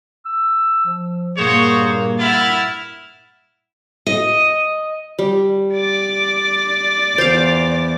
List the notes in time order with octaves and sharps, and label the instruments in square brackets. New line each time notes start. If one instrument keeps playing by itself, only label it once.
[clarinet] E6
F3
[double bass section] G2 A#2 A#3 [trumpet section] F#4 C5 C#5 [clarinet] G#4
[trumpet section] E4 [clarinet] F#5 [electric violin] F6 A6
[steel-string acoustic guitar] D#5
[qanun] G3
[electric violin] D5 D6
[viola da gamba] E2 [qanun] C5 F5